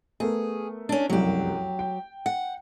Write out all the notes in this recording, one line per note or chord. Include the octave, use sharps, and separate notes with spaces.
A3 B3 G#4 A#4
C#4 D4
F1 C2 F#2 F#3 G4
G5
F#5